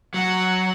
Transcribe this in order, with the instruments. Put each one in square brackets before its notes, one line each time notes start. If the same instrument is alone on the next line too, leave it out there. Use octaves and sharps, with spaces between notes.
[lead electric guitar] F#3 [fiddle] F#5